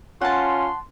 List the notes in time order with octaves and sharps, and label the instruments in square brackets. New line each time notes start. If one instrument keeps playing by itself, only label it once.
[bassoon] C#4 [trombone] F4 [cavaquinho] F#5 A5 [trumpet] C6